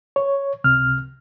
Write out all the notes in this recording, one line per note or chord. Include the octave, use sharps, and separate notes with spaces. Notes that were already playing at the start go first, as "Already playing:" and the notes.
C#5
C#2 C3 F6